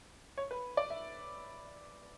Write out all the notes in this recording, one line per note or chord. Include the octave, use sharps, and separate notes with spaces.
C#5
B4
D5
E5